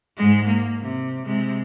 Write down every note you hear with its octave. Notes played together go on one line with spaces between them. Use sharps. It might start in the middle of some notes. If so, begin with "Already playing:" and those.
G#2 G#3
A#3
C3
C3 G#3